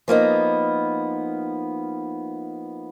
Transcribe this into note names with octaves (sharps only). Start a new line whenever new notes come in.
F3 A#3 B3 D#4